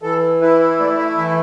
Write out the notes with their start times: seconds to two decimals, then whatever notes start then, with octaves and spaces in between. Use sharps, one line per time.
0.02 E3 A4
0.41 E4 B4
0.80 A3 D5
0.99 E5
1.18 E3 E5